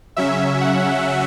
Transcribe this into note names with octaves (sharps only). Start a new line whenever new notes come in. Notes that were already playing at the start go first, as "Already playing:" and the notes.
C#3 F#3 C#4 E5
F#5